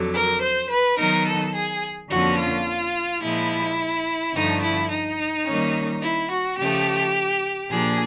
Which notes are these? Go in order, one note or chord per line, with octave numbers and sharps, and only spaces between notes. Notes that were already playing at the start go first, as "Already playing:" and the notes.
Already playing: F2 D3 F#3
A#4
C5
B4
D#3 F#3 B3 D#4 A#4
A4
G#4
F2 D3 F3 A#3 C#4 F#4
F4
A#2 F3 G#3 E4
G2 D3 F3 A3 D#4
E4
D#4
D#3 G3 A#3 C#4
E4
F#4
C#3 F3 A3 G4
A#2 F3 A#3 D4 G#4